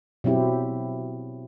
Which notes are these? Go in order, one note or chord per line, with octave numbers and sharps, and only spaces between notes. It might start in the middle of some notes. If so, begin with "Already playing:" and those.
B2 F#3 C4 E4 G4